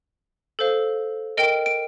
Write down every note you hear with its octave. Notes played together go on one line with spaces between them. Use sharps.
A4 C5 F5
A#4 D#5 G5 D7
D7